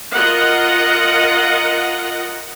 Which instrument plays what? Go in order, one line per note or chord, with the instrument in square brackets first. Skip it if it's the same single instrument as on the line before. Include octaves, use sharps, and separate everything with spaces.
[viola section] F4 A#4 D#5 F#5